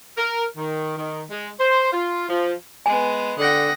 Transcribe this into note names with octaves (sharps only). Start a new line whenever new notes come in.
A#4
D#3
D#3
G#3
C5
F4
F3
G#3 B3 G#5
D3 F#5 G5 D#6 A#6